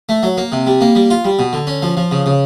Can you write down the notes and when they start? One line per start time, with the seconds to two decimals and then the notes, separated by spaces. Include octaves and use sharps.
0.09 A3
0.23 F#3
0.37 A#3
0.52 C3
0.67 G3
0.81 A#3
0.95 G3
1.10 F4
1.25 G3
1.39 B2
1.53 D3
1.67 C#4
1.82 F3
1.97 F3
2.11 C#3
2.26 C#3